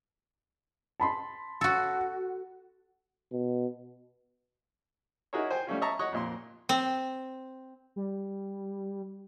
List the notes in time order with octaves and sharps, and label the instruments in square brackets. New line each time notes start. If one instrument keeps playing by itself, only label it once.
[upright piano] A5 B5 C6
[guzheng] F#4 A4
[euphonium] B2
[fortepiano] D#4 E4 F#4 G#4 A#4 C#5
C5 G5 G#5
G3 A3 C#4 F4
D#5 E5 A5 A#5 C#6
C#5 D#5 F#5 C#6 D#6
F2 A#2 C6
[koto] C4
[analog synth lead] G3